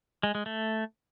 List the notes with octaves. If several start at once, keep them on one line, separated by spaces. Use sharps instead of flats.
G#3
G#3
A3